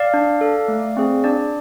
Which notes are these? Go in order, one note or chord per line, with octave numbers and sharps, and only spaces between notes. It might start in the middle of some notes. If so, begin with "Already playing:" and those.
Already playing: D5 F5
D4
A4
A3
C4 G#4
D4 D5